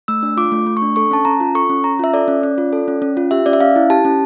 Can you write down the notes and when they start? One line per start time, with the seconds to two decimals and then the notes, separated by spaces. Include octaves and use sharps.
0.08 A3 E6
0.23 D4
0.37 F4 D6
0.52 A3
0.66 A3
0.77 C#6
0.82 D4
0.96 A4 C#6
1.11 C#4 A5
1.25 C#4 A#5
1.40 F4
1.55 A4 C#6
1.70 C#4
1.84 C#4 A#5
1.99 F4 E5
2.14 A4 D5
2.28 C#4
2.43 C#4
2.58 F4
2.73 A4
2.88 C#4
3.02 C#4
3.17 F4
3.31 G4 E5
3.46 C#4 D5
3.53 E5
3.60 C#4 F5
3.76 E4
3.90 G4 A5
4.05 C#4